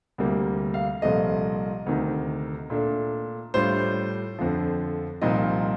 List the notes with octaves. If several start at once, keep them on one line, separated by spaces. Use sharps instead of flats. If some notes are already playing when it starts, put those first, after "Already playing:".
D2 C3 G3 A#3
F5
C2 A#2 F3 A3 D#5
D2 C3 D#3
A#2 A3 D4
A2 G3 D4 F4 C5
F2 D3 F3
C2 A#2 F3 C4 D#4 D#5